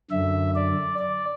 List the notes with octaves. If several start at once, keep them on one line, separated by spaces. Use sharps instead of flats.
F#2 D3 E5
D5
D5